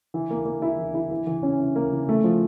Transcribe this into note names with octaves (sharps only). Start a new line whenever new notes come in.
E3
A#3
A#3
E4
E3
E4
E3
E3
C#4
E3
A#3
E3
A3
F3